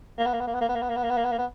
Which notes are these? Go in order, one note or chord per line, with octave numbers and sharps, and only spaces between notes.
A#3
B3
A#3
B3
A#3
B3
A#3
B3
A#3
B3
A#3
B3
A#3
B3
A#3
B3
A#3
B3